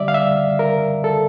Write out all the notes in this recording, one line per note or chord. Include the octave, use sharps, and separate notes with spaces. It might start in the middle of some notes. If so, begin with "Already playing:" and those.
Already playing: D2 D3 G3 D5 E5
F5
E5
A#4
A4